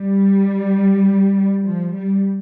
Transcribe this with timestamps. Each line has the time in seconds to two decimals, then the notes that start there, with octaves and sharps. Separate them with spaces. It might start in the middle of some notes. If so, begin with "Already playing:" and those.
Already playing: G3
1.66 F3
1.95 G3